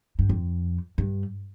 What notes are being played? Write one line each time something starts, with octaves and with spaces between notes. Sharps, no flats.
G2
F2
G2